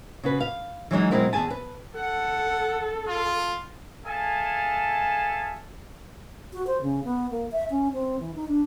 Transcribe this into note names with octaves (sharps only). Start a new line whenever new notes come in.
C#3 F#4 B4
F5
E3 F#3 G#3 D#4
B2 F#3 G#3 C4 E4 A#4
E2 B2 G#4 G#5 A5
B4
A4 F#5
F4
G#4 A4 E5 F5 G#5 A5
F#4
C5
C#3
B3
A#3
E5
C#4
C4
E3
D#4
D4